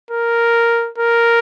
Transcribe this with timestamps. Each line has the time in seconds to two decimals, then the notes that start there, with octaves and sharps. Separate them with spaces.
0.11 A#4
0.98 A#4